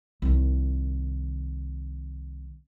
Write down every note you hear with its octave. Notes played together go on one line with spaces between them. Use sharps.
C2 D#3